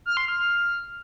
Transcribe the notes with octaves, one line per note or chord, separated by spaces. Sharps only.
F6
C6
F6